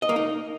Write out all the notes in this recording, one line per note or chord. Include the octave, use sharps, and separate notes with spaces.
D#5
A#3
D#4